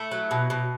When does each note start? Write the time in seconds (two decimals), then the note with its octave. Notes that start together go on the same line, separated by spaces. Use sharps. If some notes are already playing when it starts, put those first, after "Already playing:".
Already playing: A3 E4
0.11 F#3
0.31 B2
0.50 B2